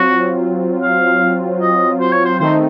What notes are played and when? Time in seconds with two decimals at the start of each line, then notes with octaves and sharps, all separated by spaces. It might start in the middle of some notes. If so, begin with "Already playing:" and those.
Already playing: F#3 C4 F4 F#4
0.83 F5
1.62 D#5
2.00 C5
2.13 C#5
2.25 C5
2.40 D#3 A3 C4 D#4 C5